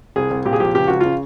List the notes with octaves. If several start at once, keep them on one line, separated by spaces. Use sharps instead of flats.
C2 G#4
C2
A#2 G4
G#4
F3 G4
C#2 G4
C#2 F#4
C#3 F4